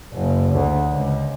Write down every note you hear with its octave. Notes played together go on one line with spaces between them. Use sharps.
F#1
D2
C#2